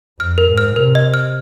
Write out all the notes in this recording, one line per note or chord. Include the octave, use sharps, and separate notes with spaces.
F2 F6
A#4
G#2
F6
C3 A#4
D#5
F6